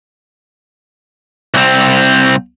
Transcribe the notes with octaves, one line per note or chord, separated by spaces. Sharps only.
C2 C4